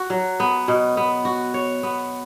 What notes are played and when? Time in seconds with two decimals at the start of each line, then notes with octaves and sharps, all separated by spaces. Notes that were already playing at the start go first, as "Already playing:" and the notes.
Already playing: F#4
0.10 F#3
0.40 B3
0.68 B2
0.97 B3
1.25 F#4
1.54 C#5
1.83 B3